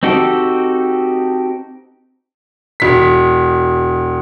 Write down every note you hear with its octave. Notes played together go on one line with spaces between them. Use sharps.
C4 D#4 F#4 G4 A4
E1 B6